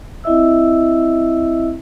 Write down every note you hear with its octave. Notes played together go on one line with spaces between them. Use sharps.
C4 E4 D#5 E5 E6